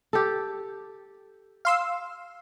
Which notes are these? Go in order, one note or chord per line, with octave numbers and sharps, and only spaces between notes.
G4 A4
F5 C6 E6